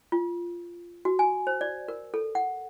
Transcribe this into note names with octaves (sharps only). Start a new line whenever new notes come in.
F4
F#4
G#5
C5
D5
A#4
A4
F#5